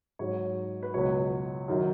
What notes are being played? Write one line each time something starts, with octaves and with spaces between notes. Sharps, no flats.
G#2 F#3 C#5
B4
C#2 B2 F#3 C#5
F#2 D#3 F#3